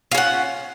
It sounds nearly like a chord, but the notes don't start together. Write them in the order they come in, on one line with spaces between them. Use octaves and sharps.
F4 C#4 F#5